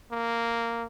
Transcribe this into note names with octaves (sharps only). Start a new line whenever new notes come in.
A#3